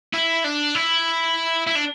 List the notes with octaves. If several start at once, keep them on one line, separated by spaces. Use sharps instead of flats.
E4
D4
E4
E4
D4